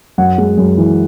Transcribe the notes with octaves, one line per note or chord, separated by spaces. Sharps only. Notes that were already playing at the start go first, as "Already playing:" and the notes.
F#2 F#5
G#3
F#2
E3